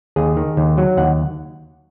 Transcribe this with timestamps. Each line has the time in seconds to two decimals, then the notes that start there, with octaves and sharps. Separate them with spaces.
0.16 D#2 G#4
0.37 D#3
0.57 D#2
0.77 F#3
0.97 D#2 F#5